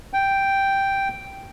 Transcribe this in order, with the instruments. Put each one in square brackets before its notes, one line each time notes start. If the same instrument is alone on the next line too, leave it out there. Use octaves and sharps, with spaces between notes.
[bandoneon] G5